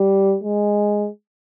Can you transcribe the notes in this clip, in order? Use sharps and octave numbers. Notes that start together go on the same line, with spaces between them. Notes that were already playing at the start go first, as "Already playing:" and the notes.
Already playing: G3
G#3